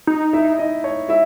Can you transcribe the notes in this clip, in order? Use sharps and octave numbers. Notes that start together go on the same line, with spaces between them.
D#4
E4 E5
D#4 D#5
C#5
E4 E5